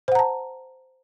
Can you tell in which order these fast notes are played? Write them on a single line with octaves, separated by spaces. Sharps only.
C5 F#5 A#5 A5